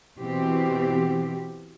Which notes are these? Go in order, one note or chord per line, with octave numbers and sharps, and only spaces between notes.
B2 E3 C4 G4